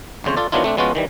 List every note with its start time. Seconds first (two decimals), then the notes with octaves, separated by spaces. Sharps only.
0.24 G1 F2 C#3 C5 C#5
0.37 F4 A4 D5
0.52 D#3 F#3 B3 D4 E4 F4
0.64 A3 C4 D4
0.77 F3 G#3 B3 C#4 F4 F#4
0.95 D#3 E3 G3